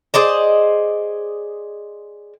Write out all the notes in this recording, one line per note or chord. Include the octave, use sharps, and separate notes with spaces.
G#4 C5 D5 D#5